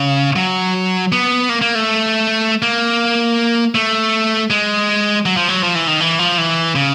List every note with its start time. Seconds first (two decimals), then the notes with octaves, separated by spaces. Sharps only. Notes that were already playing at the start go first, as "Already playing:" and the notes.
Already playing: C#3
0.36 F#3
1.12 B3
1.49 A#3
1.62 A#3
1.75 A3
2.62 A#3
3.75 A3
4.50 G#3
5.26 F#3
5.37 F3
5.49 F#3
5.63 F3
5.75 E3
5.88 D#3
6.00 E3
6.19 F3
6.38 E3
6.76 C#3